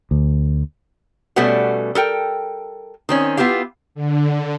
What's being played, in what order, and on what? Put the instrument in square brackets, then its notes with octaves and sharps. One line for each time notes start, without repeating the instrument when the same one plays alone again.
[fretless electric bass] D2
[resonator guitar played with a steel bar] B2 G3 A3 C#4 B4 F#5
A4 A#4 G5
D#3 C4 C#4
B3 E4 F4 G4 F5
[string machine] D3